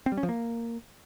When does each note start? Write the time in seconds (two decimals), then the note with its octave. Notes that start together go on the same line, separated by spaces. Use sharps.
0.06 C4
0.12 G3
0.18 C#4
0.23 F3
0.29 A#3